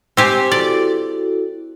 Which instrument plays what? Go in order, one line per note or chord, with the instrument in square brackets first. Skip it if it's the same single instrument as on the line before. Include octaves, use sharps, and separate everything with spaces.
[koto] C4 G4 G#5
[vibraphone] E4 F#4 A4 [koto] D5